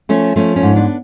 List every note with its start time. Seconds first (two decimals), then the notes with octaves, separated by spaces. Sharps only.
0.09 F3 A3 C#4
0.36 F3 A3 C#4
0.56 A3 C#4
0.62 G#2
0.75 B3 D4